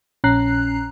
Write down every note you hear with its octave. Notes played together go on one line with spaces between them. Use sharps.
A#1 C#4 A#5 F#6 C7